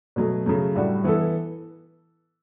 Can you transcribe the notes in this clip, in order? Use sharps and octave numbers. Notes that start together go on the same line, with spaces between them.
B2 F#3 A3
C#3 F#3 A3
A2 G3 D4 F#4
E3 B3 E4 A4